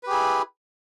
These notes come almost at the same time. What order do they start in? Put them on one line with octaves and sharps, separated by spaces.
B4 G4 G#4 E4